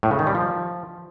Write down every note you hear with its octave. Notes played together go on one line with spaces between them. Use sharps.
A2
C#3
D#3
G3
F3